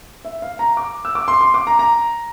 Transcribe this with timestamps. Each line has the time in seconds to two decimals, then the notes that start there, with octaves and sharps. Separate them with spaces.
0.25 E5
0.42 F5
0.59 A#5
0.77 D6
1.05 E6
1.15 D6
1.28 C6
1.41 C6
1.54 D6
1.67 A#5
1.79 A#5